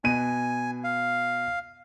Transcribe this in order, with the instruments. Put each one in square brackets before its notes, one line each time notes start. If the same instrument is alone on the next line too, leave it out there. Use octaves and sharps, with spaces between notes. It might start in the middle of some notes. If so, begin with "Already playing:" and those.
[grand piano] B2 D#7 [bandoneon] G#5
[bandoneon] F5